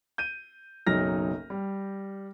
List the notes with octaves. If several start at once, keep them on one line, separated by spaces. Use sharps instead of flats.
G6 D#7
F#1 B1 F#3 D#4 F6 A#6
G3